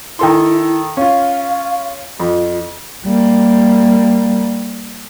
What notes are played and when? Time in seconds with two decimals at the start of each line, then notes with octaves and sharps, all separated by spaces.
0.19 D#3 E4 A4 C6
0.97 C#4 F4 F5
2.20 F2 F4
3.06 G3 A#3